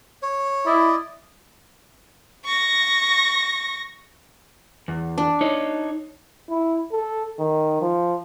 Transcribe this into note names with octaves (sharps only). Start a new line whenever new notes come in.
C#5
E4 D5 D#5
C#6 A#6
E2
D4
D#4 C#5
E4
A4
D#3
F3